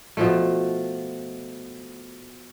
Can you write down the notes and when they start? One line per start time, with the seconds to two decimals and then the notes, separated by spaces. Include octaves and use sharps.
0.17 B2 F3 A3